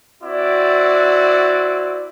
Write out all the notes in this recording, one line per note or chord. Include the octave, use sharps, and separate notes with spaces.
C4 E4 F#4 D5